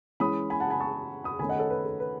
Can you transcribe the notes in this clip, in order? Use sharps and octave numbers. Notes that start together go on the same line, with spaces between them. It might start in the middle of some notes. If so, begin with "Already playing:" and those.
E3 G#3 C#4 B5 D#6
G#5 B5
F#5 A5
G#5 B5
A5 C#6
B5 D#6
D#3 A3 C#4 G#5 B5
D#5 F#5
A4 C#5
B4
A4
B4